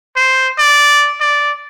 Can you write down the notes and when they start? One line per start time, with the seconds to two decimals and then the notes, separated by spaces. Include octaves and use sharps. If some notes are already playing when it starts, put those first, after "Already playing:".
0.16 C5
0.58 D5
1.21 D5